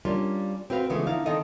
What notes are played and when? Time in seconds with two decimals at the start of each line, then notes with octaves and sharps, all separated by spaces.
0.05 G3 A#3 C#4 D4 F4
0.70 C4 F#4 B4 F5
0.90 C#3 E3 F3 G#3 A3 B3
1.06 D3 D#4 E4 F5
1.26 D#3 C4 A4 D#5 F5